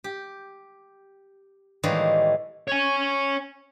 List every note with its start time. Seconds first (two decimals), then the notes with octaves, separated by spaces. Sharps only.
0.04 G4
1.83 A2 D#3 E3 G3 G#3 A#3
2.68 C#5 G#5